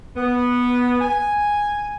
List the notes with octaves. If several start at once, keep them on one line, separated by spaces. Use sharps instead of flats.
B3
G#5